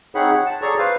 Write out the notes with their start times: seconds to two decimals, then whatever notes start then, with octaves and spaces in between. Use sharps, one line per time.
0.15 C4 D#4 G#4 C#5 F#5 B5
0.32 F#5
0.46 A5
0.62 G#4 A4 C#5 D5 A#5 C#6
0.79 B4 C5 F5